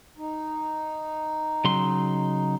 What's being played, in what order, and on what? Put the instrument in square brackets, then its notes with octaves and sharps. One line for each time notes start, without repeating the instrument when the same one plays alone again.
[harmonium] D#4
[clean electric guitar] C#3 F#3 C6